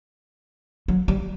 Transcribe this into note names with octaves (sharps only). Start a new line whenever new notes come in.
F#3
G3